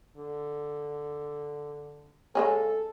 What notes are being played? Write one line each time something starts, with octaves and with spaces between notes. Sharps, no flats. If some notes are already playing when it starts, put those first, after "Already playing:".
D3
C#3 G#3 C#4 A4